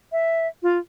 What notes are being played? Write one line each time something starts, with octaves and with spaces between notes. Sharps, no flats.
E5
F4